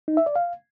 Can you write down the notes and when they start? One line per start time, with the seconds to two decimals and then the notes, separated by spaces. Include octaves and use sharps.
0.08 D#4
0.17 E5
0.26 D5
0.36 F5